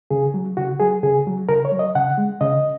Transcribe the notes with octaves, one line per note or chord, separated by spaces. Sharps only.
C#3 G#4
F#3
C#3 F#4
F#3 G#4
C#3 G#4
F#3
C#3 A#4
C#5
F#3
D#5
C#3 F#5
G#3
C#3 D#5